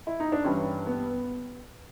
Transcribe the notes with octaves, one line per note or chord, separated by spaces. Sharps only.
E4
D#4
D4
G2 E3 G3 C#4
B3